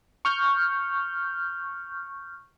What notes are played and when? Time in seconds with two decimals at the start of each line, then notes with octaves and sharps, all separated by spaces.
0.25 C#6 F6 G6